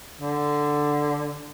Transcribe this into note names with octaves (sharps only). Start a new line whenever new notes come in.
D3